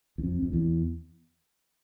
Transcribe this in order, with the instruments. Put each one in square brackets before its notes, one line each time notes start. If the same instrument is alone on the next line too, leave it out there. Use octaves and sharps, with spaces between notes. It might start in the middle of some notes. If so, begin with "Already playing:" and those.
[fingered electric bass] E2
F2
F2
E2